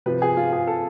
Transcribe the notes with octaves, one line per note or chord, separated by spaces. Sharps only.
C3 F3 B4
G#4
F4
G#4
A4